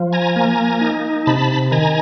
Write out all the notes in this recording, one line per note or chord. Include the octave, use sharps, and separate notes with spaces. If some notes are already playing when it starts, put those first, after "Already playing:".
Already playing: F3
G#5 A#5
A#3
D#4
C3 A5 B5
D#3 G#5 A#5